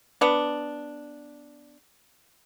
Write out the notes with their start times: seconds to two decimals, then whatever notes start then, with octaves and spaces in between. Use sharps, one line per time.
0.21 B3 D4